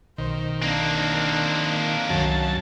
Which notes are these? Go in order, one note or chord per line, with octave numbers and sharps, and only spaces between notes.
B1 D#3 C5
A#3 C4 D4
C2 F#2 D#3 C#5 A5